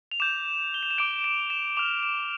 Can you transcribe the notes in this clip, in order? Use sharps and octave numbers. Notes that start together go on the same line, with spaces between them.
F7
D6 G6 E7
G7
F7
E7
D6 G6 D7
E7
E7
D6 F6 F7
E7